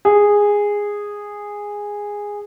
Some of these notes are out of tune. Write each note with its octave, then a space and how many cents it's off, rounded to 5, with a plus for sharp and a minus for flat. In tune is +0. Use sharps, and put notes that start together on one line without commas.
G#4 -10